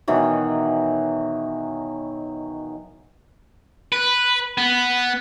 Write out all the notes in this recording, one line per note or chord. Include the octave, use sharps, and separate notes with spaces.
B2 D#3 E3 F#3
B4
B3